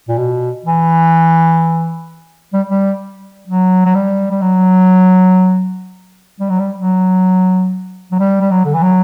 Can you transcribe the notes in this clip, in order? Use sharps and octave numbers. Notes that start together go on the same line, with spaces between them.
A#2
B2
E3
G3
G3
F#3
F#3
G3
G3
F#3
G3
F#3
G3
F#3
F#3
G3
G3
F#3
D3
E3
F#3